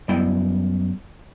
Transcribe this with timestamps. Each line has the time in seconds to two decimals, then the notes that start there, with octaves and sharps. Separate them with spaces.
0.09 F#2 G3 B3 E4 G5